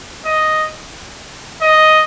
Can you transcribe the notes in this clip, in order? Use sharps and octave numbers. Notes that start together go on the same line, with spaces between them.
D#5
D#5